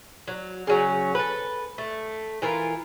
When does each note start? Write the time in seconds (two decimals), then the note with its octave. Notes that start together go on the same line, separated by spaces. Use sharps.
0.28 F#3
0.67 C#3 F#3 C#4
1.15 A4 B4
1.78 A3
2.42 E3 F4 A#4